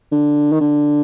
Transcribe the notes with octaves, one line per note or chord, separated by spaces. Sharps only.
D3
D#3
D3